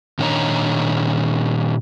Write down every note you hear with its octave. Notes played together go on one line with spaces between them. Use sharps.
A#2 D#3 D4 C#5 D#5 A#5